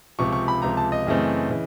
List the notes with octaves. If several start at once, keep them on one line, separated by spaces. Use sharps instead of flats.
C#2 C3 F3 C#6
C#6
B5
C#2 C3 F3 A#5
A5
D#5
F#2 C#3 E3 A3 C4
C#3 E3